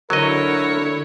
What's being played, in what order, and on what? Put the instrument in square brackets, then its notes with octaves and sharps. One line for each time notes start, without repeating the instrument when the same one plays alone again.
[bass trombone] D3 [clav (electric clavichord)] F#3 D#5 [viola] E4 C#5 [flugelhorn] A#4